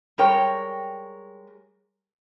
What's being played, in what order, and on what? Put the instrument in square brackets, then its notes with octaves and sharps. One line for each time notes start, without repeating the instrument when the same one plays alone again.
[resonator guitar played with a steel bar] G3 G#3 A#4 C#5 G5